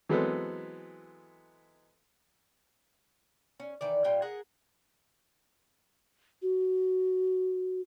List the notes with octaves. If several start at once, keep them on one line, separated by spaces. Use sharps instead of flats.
E3 F#3 G#3 B3 C4 A4
C#4
D#3 E3 D5
A#2 G3 F4 G5
G#4 A#4 F#5
F#4